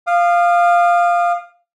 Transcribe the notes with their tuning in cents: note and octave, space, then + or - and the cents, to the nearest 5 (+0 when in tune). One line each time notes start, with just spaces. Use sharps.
F5 +0 D#6 -40